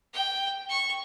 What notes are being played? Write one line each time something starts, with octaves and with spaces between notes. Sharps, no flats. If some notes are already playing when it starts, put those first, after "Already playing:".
G5
C#6